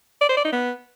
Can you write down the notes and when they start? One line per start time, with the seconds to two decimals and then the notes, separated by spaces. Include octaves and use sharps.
0.21 D5
0.29 C5
0.37 D5
0.45 D#4
0.53 B3